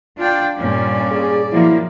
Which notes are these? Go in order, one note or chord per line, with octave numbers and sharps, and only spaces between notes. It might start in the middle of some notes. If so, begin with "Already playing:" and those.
D4 F4 D5 G5
G2 A#2 C#4 D5
G#4
F3 F#3 A#3 E4